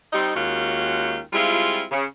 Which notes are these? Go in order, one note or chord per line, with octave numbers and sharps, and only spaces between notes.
G3 C4 D#4
D#2 D#3 G#3 C#4 F4 F#4
G3 G#3 C4 E4 F4
C#3